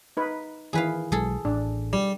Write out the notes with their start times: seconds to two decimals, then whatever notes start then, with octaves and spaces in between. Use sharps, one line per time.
0.17 D#4 B4
0.73 D#3 E3 G#4 B4 F5
1.12 B1 F#3 G#3 G#4 A4
1.45 A1 D4
1.93 G3